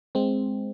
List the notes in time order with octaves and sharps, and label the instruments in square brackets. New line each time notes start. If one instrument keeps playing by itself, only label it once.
[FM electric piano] G#3 C4